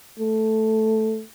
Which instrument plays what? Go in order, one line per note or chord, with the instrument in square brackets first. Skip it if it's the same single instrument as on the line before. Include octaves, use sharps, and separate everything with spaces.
[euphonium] A3